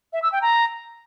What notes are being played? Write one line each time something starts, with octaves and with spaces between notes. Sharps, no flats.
E5
E6
G5
A#5